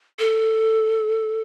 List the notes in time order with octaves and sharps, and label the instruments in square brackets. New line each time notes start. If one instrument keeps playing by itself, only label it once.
[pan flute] A4